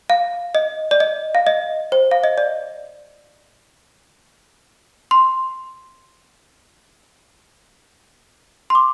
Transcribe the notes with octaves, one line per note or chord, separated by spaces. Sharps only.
F5
D#5
D5
D#5
F5
D#5
C5
F5
D#5
D5
C6
C6
D6